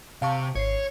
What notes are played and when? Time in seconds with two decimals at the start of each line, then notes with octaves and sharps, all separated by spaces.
0.22 C3 F5 A5 C#6
0.55 G#1 C#5 C7